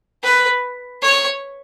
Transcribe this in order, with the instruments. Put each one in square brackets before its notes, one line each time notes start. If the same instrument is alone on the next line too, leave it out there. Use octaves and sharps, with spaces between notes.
[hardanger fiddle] B4
C#5